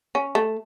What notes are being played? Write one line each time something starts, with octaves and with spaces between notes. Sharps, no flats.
C#4
A3